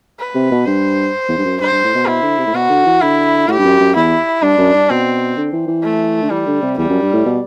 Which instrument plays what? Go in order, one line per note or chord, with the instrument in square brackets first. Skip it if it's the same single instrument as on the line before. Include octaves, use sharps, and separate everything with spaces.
[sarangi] B4
[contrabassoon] C3
B2
[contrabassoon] G2 [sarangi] C5
[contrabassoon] E2
G2
F#2
[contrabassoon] G2 [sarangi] C5
[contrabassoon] G2
A2
B2
[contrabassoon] B2 [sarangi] E4
[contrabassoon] D3
C3
A2
[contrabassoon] B2 [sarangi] F#4
[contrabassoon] D3
E3
[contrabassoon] D3 [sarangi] E4
[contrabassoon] A2 [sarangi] G4
[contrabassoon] G2
F#2
F#2
[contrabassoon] E2 [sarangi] E4
[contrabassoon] G2 [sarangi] D4
[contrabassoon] F#2
G2
[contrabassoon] B2 [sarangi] C4
[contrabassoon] D3
E3
E3
[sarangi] A3
[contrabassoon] D3
[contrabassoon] E3 [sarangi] G3
[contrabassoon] D3
C3
[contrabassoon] E2 [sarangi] G3
[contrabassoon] F#2
G2
A2
B2